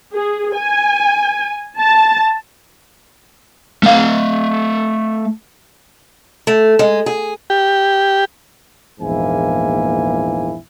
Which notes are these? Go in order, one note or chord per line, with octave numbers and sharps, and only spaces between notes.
G#4
G#5
A5
A3 F5
A3
G#3
G#4
G4
A#1 E2 G#2 A#3 E4 G#5